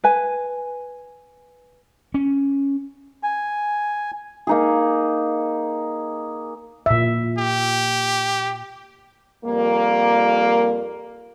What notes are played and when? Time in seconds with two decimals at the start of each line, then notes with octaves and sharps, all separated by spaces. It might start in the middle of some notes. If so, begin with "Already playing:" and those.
0.04 B4 G#5
2.14 C#4
3.23 G#5
4.47 A#3 D#4 G#4
6.86 A#2 E5
7.39 G4
9.45 F2 G3 A#3